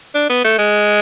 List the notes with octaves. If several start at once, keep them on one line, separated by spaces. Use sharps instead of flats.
D4
B3
A3
G#3